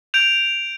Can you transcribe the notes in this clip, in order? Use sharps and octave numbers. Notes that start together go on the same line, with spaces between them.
G6 D7 F7